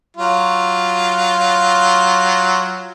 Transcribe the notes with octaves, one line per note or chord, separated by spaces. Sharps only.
F#3 F4